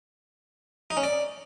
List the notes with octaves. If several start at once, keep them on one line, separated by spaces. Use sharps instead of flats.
D#4
C#4
D5